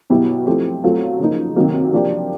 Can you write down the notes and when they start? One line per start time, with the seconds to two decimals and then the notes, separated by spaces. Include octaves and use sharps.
0.10 B2 F#3 B3 E4 G4
0.46 F3 A3 C4 E4 G4
0.84 F#3 A3 C4 F4
1.19 C#3 F3 A#3 D#4
1.56 C3 D#3 F#3 A#3
1.93 F3 A#3 D4 G4